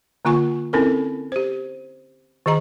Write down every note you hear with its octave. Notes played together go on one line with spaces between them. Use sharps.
D3 A#3 F4 G#5 C#6
C4 C#4 E4 A4 A#4
G4 C5
D#3 G#4 D#5 A#5